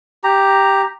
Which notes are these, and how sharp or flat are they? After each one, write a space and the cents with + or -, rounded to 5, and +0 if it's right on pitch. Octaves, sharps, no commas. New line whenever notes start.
G4 +0 A#5 +0